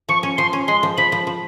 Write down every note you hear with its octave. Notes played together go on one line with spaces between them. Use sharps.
F3 C#6
C#4
F3 C6
C#4
G#3 C6
F3
F3 B5
F3
F3